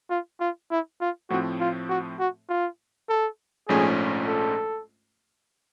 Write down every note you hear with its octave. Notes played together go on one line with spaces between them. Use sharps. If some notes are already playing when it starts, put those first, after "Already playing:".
F4
F4
E4
F4
A2 F3 A3 C4 F#4
F4
F#4
F#4
F4
A4
A#1 G#2 F3 A3 C#4 G#4
A4